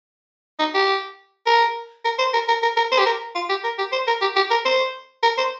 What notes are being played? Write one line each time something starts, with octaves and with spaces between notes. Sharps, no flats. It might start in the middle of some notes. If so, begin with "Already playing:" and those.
D#4
G4
A#4
A#4
C5
A#4
A#4
A#4
A#4
C5
G4
A#4
F4
G4
A#4
G4
C5
A#4
G4
G4
A#4
C5
A#4
C5